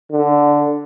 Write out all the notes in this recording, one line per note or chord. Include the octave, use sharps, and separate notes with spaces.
D3